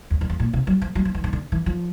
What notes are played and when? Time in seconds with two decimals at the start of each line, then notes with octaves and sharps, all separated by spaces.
0.10 E2
0.21 F2
0.30 E2
0.40 A#2
0.53 C3
0.67 F#3
0.82 F3
0.95 F#3
1.05 F3
1.15 E3
1.24 D#3
1.33 D3
1.52 E3
1.66 F3